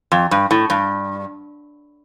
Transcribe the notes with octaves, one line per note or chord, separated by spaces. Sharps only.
F2
G2
A2
G2